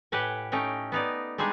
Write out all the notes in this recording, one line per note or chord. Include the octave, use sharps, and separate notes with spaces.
A2 G4 B4 F#5 G#5
A3 C#4 D#4 G5
B3 D#4 D5
G3 G#3 D4 D#4 G#4